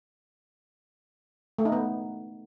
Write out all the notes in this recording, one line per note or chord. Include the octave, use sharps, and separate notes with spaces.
A3
D#4
B3